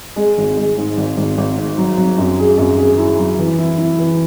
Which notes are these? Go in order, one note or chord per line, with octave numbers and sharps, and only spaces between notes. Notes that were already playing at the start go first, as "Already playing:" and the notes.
G#3
G#1
G#3
G#2
G#1
G#1
G#1
G#2
F#3
F#3
F#2
G#4
F#2
G#4
E4
F#3
E3
E4
E4
E3